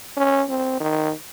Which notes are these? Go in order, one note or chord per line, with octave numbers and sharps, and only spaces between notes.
C#4
C4
D#3